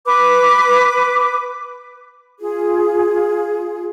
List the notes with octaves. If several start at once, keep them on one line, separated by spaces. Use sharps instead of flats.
B4 D6
F4 G#4